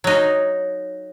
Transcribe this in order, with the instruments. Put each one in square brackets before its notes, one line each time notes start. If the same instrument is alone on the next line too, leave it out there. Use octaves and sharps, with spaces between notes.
[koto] F#3 D#4